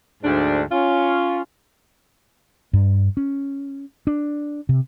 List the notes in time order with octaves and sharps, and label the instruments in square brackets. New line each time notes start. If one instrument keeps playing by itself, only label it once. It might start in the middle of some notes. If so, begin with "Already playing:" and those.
[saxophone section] D2 G#2 D4
C#4 F4
[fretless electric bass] G2
C#4
D4
C3